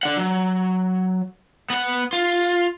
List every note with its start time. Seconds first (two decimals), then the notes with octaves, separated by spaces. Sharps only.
0.03 D4 F#5
0.17 F#3
1.70 B3 F#5
2.13 F4